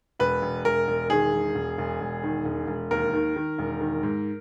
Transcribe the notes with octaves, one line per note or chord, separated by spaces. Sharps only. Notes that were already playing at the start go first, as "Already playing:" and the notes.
E1 B4
E1
E1 A#4
E1
D#3 G#4
E1
E1
E1
E1
D#3
E1
E1
D#2 A#4
D#3
D#3
E1
D#3
G#2